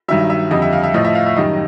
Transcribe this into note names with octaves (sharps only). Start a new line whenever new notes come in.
G2 D#3 F#3 E5
E5
F2 D3 G3 D#5
E5
F5
E5
A2 F3 D#5
E5
F5
E5
F#2 D#3 G3 D#5